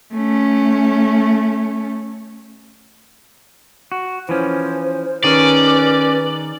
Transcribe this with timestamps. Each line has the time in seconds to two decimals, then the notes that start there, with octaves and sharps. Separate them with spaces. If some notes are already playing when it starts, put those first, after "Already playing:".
0.14 A3 C#4
3.92 F#4
4.29 E3 F3 C#4 C5
5.24 D#3 C#4 G#4 B4 D5